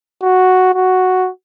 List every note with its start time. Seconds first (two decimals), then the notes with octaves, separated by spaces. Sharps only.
0.22 F#4
0.74 F#4